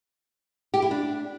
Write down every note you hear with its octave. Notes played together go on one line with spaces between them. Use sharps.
G4
E4
D4